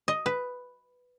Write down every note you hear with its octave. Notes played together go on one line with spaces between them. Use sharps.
D#5
B4